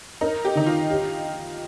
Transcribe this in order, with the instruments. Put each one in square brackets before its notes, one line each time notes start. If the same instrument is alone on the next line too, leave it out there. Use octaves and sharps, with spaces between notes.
[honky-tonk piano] D#4 [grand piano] A#4
[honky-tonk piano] G4
[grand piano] D#3 [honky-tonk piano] D#4
[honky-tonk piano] F4
[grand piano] G4